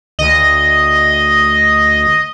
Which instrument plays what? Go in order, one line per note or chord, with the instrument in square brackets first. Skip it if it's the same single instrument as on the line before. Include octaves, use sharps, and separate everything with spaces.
[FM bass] D2 [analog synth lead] D#5